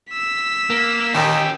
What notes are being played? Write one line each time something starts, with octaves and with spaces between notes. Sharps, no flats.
E6 B6
A#3
D#2 D#3 C#4 G4